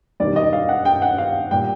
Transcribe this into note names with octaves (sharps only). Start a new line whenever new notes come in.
E1 D#2 D#3 G3 D5
D#5
F5
F#5
G5
F#5
F5
A#2 G3 G5